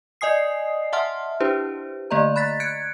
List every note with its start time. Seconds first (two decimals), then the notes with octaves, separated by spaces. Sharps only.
0.21 D5 D#5 G#5 D#6 C7
0.93 E5 F#5 A5 C6 F6
1.41 D4 E4 G4 B4 C5
2.11 D3 A3 A#3 D5 D#5 A#5
2.36 B5 F#6 A6 B6
2.60 F#6 G#6 C#7 D7